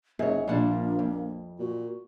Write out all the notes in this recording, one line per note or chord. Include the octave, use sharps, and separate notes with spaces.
F#1 G#2 C3 A#3 G#4 C#5
A#1 A#2 F3 G3 D4 F#5
F2
A#2 F#4